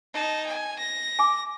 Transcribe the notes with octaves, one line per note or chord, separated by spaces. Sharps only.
D#4 A5
G#5
A#6
G#5 D6